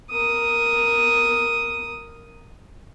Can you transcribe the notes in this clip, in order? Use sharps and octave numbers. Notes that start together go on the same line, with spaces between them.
A#4 D#6